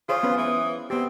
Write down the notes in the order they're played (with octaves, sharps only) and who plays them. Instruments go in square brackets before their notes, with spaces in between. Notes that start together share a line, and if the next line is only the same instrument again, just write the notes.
[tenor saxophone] F4 [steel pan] G#4 C5 C#5 [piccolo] D#6
[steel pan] B3 C#4 B4
[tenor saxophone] E3
[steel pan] B3 G4 [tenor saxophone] C4